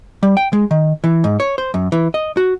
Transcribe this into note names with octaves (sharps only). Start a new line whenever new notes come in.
G3
G5
G#3
D#3
E3
G#2
C#5
C5
F#2
E3
D#5
F#4